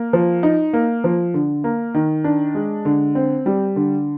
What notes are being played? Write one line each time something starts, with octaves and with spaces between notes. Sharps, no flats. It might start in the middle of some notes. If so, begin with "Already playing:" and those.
Already playing: A#3
F3
D#4
A#3
F3
D3
A#3
D#3
D4
G#3
D3
C4
G3
D3